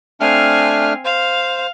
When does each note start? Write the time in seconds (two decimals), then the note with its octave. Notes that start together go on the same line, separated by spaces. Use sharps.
0.21 A3 C4 D4 F5 G#5 F6
1.05 C5 F5